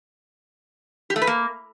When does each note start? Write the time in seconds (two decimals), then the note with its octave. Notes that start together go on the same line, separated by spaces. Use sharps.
1.10 G4
1.16 A3
1.22 B4
1.27 A#3